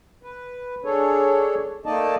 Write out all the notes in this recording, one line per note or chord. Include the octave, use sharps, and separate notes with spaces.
B4
D4 G#4 A4 C#5
A3 A#3 D#4 D5 D#5 A5